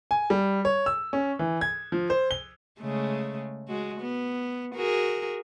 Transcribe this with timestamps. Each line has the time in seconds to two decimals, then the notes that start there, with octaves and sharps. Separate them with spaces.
0.11 G#5
0.30 G3
0.65 C#5
0.86 E6
1.13 C#4
1.39 E3
1.61 G#6
1.92 F3
2.10 C5
2.31 G7
2.81 C#3 G#3 A3
3.68 G#3 F#4
4.01 B3
4.75 F#4 G#4 A#4